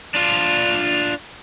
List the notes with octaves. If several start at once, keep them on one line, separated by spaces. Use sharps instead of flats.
D4 F4